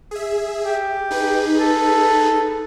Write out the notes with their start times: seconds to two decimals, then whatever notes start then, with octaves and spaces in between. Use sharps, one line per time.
0.11 G#4 E5
0.64 G4
1.11 D#4 G#4 B4
1.59 A4